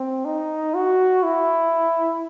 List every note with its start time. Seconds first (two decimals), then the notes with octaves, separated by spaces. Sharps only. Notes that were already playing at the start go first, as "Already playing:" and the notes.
Already playing: C4
0.25 D#4
0.74 F#4
1.23 E4